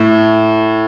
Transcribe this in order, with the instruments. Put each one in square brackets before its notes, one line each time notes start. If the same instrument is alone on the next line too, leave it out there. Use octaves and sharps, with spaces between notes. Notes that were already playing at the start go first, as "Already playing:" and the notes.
Already playing: [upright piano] A2